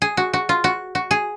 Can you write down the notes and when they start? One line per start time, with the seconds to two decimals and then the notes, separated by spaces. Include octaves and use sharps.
0.02 G#4
0.17 F#4
0.33 F#4
0.49 F4
0.64 F#4
0.95 F#4
1.11 G#4